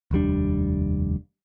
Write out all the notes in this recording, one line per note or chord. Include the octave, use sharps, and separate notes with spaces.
F1 D#2 G3 D4